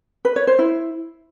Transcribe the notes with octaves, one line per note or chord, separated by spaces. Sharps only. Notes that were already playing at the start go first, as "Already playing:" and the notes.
B4
C#5
C5
E4